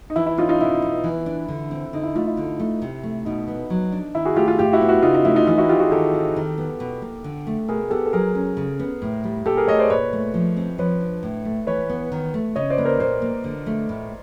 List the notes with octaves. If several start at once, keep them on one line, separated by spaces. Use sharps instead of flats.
D#4
E3 E4
E4
C#4 D#4 F4
D#4 F4
B2 E4
B3
E3
D4
D3
C4
D3 D#4
E4
A3 D#4 F4
E4
D3
A3
C3
A3
B2 D#4
B3
F#3
D4
D#3 E4
F#4 G#4
A3 F4 G4
F4 G4
A2 F4 G4
E4 F#4
B3
E4 F#4
C#3 D#4 F4
D#4
A3 E4
D#4 F4
E3 D#4 F4
E4 F#4
C4 F4 G4
F#4 G#4
D#3 G4 A4
C4
D#3
B3
B2
A#3
D3
A3
B2 G#4 A#4
B3 G4 A4
A4
F#3 G#4 A#4
C#4
C#3
B3
A2
G3
A#2 G4 A4
G#4 A#4
A3 C#5 D#5
C5 D5
A#2 B4 C#5
A3
F3
C4
F3 B4 C#5
D4
A2
A3
E3 B4 C#5
B3
D#3
A3
C#3 C#5 D#5
C5 D5
A#3 B4
A#4 C5
A#2 A#4 C5
A#3
D3
A3
A2